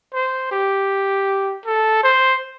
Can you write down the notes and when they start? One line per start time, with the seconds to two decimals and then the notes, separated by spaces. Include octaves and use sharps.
0.14 C5
0.52 G4
1.66 A4
2.04 C5